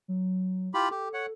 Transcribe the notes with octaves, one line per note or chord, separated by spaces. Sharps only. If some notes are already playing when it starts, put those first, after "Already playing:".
F#3
E4 F4 G4 B5
G4 A4
C#5 F#5